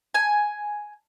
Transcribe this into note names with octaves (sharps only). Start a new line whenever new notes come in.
G#5